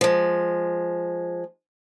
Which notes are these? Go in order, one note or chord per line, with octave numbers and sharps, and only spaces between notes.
F3 G#3